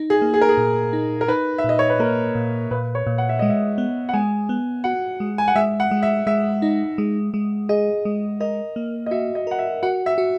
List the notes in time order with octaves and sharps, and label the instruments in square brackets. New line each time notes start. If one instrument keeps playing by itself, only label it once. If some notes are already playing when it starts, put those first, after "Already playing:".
Already playing: [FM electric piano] D#4
[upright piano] G#4
[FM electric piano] A#3
[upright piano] G#4
A#4
G#4
[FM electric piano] A#2
D#4
[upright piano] A#4
[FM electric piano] D#4 [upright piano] B4
[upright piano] E5
[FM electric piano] A#2 [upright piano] D#5
[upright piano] C#5
B4
[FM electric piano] A#3 [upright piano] A#4
[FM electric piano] A#2
[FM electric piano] A#2 [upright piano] B4
[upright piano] C#5
[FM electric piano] A#2
[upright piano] F#5
E5
[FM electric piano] G#3 [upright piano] D#5
[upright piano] E5
[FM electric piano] B3
[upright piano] F#5
[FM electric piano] G#3 [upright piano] G#5
[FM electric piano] B3
[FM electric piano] F#4 [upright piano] F#5
[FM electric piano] G#3
[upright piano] G#5
F#5
[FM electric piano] G#3 [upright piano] E5
[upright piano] F#5
[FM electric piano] G#3
[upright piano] E5
[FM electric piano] G#3 [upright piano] E5
[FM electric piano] D#4
G#3
G#3
[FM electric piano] G#4 [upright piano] D#5
[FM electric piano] G#3
[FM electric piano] A#4 [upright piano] D#5
[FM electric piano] A#3
[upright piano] D#5
[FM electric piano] F#4 [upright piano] E5
[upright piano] D#5
[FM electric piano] A#4 [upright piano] F#5
[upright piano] E5
[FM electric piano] F#4 [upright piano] F#5
[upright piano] E5
[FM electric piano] F#4